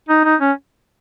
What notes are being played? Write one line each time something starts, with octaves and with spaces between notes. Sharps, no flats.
D#4
D#4
C#4